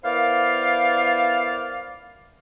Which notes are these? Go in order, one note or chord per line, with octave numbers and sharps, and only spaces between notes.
B3 E4 A#4 C5 D5 F5